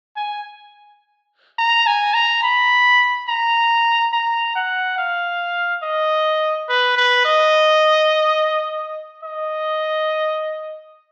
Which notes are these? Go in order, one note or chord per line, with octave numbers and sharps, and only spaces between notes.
G#5
A#5
G#5
A#5
B5
A#5
A#5
F#5
F5
D#5
B4
B4
D#5
D#5